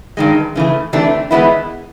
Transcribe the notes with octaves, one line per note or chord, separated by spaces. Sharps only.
G2 D#3 G#3
C#3 E3 A3
C3 E3 A3 D4
E3 G#3 B3 E4